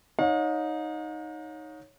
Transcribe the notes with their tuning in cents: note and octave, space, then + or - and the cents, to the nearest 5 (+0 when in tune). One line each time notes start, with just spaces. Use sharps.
D#4 +0 C#5 +0 F5 +45